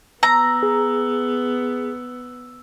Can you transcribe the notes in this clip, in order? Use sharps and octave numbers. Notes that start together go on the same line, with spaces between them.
B3 A#5 E6
G#4